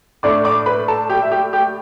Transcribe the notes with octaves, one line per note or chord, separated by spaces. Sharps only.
A2 A3 D4 D5 D6
D5 D6
B4 B5
A4 A5
G4 G5
E5
G4 G5
G4 G5